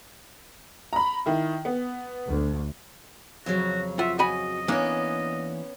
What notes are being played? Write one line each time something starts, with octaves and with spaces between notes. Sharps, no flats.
A#5 B5
D#3 E4
B3
D2
F2 C#3 F#3 F#4
F4 E5 F#5
F#4 D#5 G#5 B5
E3 A#3 B3 C#4 D4